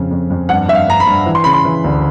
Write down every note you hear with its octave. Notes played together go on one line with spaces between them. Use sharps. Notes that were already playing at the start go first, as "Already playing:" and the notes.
Already playing: F2 C#3
F2
F2
G2 F#5
G2 E5
F5
G2 A#5
B5
G2
E3
C6
C#3 B5
C6
E3
D2